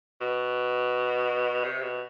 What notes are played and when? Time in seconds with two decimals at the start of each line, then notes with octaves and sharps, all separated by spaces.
0.21 B2
1.64 C3
1.82 B2